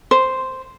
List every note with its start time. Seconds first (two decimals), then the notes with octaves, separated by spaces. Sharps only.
0.11 C5